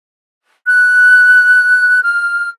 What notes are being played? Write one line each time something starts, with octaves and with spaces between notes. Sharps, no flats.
F#6
F6